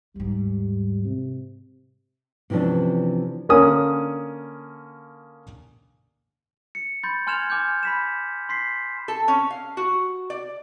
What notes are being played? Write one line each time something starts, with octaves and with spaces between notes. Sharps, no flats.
D#2 G#2 G3
C3
C3 E3 F3 C#4 D4
D3 A#3 C#4 D#6
C#7
B5 C6 G6 A6
G#5 C6 F6 G#6 E7 F7
G#5 D6 F6 G6
B5 B6 E7
C6 B6 C7
A4
C#4
F5
F#4
D5